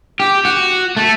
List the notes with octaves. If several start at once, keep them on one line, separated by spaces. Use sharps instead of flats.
G4
F#4
A3